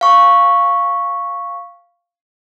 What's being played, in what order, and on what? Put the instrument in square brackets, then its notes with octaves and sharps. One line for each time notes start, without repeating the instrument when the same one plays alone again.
[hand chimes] F5 C#6